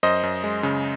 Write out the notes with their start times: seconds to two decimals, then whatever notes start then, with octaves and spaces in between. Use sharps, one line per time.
0.03 F#2 C5 D#5
0.23 F#2
0.44 G#3
0.63 C#3